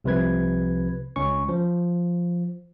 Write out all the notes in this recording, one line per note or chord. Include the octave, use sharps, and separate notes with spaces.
C2 C3 F3 B4 G#6
C#2 C#4 C#6
F3